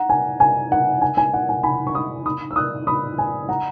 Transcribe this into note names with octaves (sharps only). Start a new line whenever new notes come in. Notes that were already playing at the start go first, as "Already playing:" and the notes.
Already playing: F#5 A#5
G#5
G#5
F#5
G#5
G#5
F#5
G#5
G#5 B5
C#6
B5 D#6
B5 D#6
E6
D#6 F#6
B5 D#6
G#5
F#5 A#5